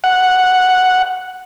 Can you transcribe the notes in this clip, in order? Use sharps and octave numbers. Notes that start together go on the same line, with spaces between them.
F#5